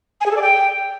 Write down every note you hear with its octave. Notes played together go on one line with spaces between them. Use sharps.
G#5
G#4
A4
D5
G5